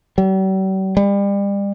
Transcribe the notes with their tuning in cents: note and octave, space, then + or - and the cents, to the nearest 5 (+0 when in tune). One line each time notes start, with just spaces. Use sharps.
G3 -45
G3 +35